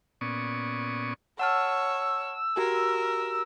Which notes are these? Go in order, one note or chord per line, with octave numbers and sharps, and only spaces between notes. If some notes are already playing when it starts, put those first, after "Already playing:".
A#2 B3 C#4 D5 C#6 D#6
C#5 F#5 A5 E6 F6
F#4 G4 A#4